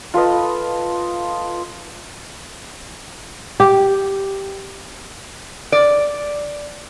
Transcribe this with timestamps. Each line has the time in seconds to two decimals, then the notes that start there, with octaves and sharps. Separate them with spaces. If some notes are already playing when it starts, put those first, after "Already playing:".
0.14 F4 A4 B4 D#5
3.60 G4
5.72 D5